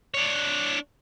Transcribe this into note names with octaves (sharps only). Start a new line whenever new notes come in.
D4 C#5